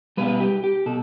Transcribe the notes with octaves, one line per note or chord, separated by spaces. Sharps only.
B2 G3 B4
G4
G4
B2 A4